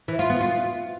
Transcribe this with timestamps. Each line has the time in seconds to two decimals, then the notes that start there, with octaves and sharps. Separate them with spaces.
0.08 E3
0.19 F4
0.30 B3
0.40 F4